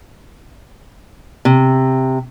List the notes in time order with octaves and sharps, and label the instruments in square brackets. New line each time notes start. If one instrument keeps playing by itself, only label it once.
[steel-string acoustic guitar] C3